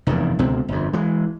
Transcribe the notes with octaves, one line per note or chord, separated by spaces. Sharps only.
F1 E2 G2 D#3
C#2 B2 D3 C4
G1 F2
E3 G#3